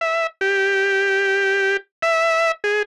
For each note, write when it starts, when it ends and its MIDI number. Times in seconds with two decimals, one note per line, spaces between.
0.01 0.27 76
0.41 1.77 67
2.02 2.52 76
2.64 2.82 68